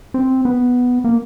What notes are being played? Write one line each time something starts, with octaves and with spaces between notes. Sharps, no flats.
C4
B3
A#3